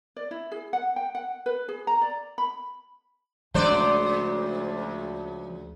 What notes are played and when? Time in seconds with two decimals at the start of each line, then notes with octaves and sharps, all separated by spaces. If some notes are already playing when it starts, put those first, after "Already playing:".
0.16 D5
0.31 E4
0.52 G#4
0.73 F#5
0.96 G5
1.15 F#5
1.46 B4
1.68 G#4
1.87 A#5
2.01 D5
2.38 B5
3.54 D2 C#3 F3 G#3 D4 C5 D5